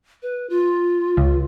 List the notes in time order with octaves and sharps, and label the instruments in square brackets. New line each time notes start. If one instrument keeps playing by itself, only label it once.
[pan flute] B4
F4
[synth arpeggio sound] C#2